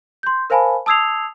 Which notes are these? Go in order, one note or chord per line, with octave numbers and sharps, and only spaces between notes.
C6 G6
A#4 C5 F5 G#5 A5 B5
A5 D#6 E6 G#6 C7 F7